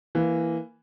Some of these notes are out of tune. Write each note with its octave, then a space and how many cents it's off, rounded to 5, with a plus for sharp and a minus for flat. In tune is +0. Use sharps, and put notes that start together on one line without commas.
E3 +5 A#3 -5